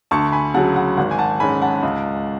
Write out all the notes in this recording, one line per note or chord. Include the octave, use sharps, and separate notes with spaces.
D2 A5 C#6
G#5 B5
C#3 F#3 F#5 A5
F#5
G#1 F#5
G#5
F#5 A5
G#2 G#3 C#4 G#5 B5
F#5 A5
C#2